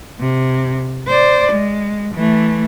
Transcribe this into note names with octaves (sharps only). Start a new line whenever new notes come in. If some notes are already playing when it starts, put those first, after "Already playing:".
C3
C5 D5
G#3
E3 A3